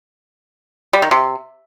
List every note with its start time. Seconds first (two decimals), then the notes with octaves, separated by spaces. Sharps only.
0.93 G3
1.02 D#3
1.11 C3